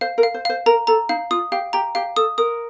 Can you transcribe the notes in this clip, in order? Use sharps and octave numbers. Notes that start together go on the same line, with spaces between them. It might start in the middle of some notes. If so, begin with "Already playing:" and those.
C5 F5
A#4
F5
C5
C5 F5
A#4 A#5
A4 A#5
D#4 F5
F4 D#6
G4 F5
G4 A#5
G4 F5
A4 D#6
A#4 D#6